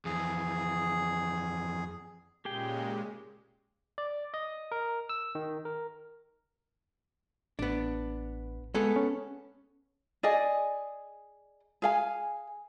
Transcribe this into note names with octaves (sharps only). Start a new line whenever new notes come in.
F2 E3 G#4
A#2 C#3 G#3 G4 G#4 G5
D5
D#5
A#4
E6
D#3
A#4
A1 B3 D4
G#3 B3 G#4 A4
C#4
G#4 D5 D#5 G#5
G#4 F5 G#5